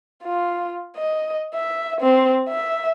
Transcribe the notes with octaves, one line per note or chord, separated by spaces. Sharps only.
F4
D#5
E5
C4
E5